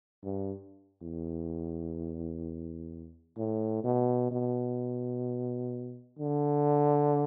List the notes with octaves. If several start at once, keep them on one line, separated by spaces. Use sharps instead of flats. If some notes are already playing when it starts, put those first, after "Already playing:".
G2
E2
A2
B2
B2
D3